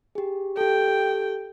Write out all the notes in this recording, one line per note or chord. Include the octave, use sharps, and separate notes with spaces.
G4 G#4
G4 A4 G5